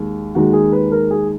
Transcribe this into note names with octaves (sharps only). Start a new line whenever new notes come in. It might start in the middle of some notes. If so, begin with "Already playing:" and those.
Already playing: D#2 D#3 G#3
D#2 D#3 G#3 F#4
G#4
B4
A#4
G#4